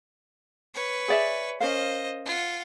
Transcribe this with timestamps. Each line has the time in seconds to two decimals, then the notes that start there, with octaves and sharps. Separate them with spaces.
0.74 B4 C#5
1.08 G#4 D5 E5
1.60 C#4 A#4 C5 D#5 F5
2.26 F4 F#5